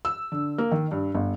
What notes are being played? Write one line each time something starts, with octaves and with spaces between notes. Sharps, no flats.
E6
D3
A#3
D#3
G2
G1